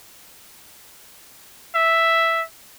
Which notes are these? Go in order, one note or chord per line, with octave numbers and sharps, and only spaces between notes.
E5